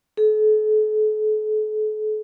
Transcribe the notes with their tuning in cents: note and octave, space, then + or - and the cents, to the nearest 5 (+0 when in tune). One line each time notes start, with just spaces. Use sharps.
A4 -45